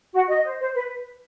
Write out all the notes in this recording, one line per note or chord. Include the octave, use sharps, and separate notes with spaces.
F#4
D#5
C5
C5
B4